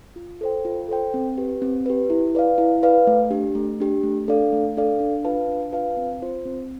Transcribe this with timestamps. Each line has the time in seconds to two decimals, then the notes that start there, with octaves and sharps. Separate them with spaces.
0.16 F4
0.41 A4 C5 G5
0.65 F4
0.89 A4 C5 G5
1.14 C4
1.38 G4 B4
1.62 C4
1.86 G4 B4
2.10 E4
2.35 B4 D5 F5
2.58 E4
2.83 B4 D5 F5
3.07 A3
3.31 D4 G4
3.55 A3
3.80 D4 G4
4.03 A3
4.28 D4 A4 D5 F5
4.53 A3
4.77 D4 A4 D5 F5
5.00 D4
5.25 F4 B4 F5 A5
5.48 D4
5.73 F4 B4 F5 A5
5.97 C4
6.22 F4 C5
6.45 C4